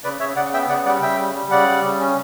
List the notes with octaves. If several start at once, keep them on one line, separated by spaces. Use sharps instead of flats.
C#3 B4 D5
C#3 C#5 E5
C#3 D5 F#5
B3 E5 G5
C#3 D5 F#5
G3 D5 F#5
C#3 E5 G5
G3
G3
C#3 D5 F#5
G3
C#3
C#4